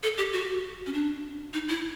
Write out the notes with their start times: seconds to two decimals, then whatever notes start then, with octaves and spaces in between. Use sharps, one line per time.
0.03 A4
0.18 G4
0.33 F#4
0.87 C#4
0.93 D4
1.54 D#4
1.68 E4